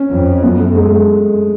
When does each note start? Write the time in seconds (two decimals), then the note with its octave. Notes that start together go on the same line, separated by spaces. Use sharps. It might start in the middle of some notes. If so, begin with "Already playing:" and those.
Already playing: C#4
0.11 F2
0.43 F#2 B3
0.59 A3
0.75 G#3
0.83 A3